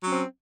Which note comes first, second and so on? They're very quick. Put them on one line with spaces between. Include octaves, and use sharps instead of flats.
F#3 C#4 C4